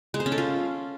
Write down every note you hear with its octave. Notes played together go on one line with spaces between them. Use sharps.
G#3
C5
C#4
A4
F4